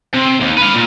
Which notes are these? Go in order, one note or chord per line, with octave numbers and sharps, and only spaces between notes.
C3
D#2
B4 F5
A#2